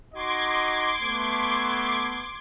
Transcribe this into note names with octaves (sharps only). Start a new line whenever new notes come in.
D#4 F#4 D#5 C6 D6 G#6
A3 B3